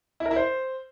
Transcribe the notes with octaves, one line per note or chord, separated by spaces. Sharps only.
E4
A#4
E4
C5